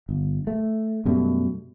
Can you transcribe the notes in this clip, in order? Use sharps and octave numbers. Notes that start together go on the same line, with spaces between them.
G1
A3
F#2 B2 G3 A3